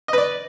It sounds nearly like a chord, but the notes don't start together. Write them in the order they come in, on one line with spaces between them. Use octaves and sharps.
D#5 B4 D5